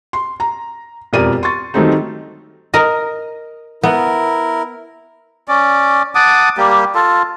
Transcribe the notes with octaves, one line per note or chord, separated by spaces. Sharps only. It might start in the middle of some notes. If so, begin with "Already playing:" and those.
C6
A#5
E1 F2 G4 A#4 D5 D#7
C6 C#6 A6
D#3 F#3 G3 A3 C4 D#4
A#4 D#5
B3 E4 A#4
C#4 D5
F#5 A5 D6 D#6
G3 A#3 G4
F4 A4